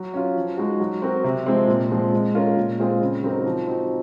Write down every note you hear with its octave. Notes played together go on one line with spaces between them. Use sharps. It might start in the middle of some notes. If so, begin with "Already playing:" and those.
Already playing: F#3
C#4 F4
F3
G#3 D#4 F#4
F#3
C4 F#4 A#4
C3
F3 G#3 C4
A#2
F3 G#3 C4
G#3
C#4 F4 A#4
A#2
G#3 C4 F4 G#4
C#3
F#3 C4 D#4 A#4
F3
C4 D#4 F#4